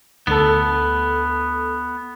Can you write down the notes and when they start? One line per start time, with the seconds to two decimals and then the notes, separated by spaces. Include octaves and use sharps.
0.27 D2 B3 A4